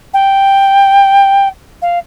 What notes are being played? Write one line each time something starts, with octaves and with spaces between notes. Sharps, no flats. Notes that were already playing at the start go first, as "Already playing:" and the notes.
G5
F5